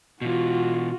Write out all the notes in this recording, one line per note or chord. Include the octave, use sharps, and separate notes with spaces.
B2 E3 F4 F#4